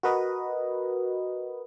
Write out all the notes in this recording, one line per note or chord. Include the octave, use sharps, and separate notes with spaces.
F#4 A#4 B4 D#5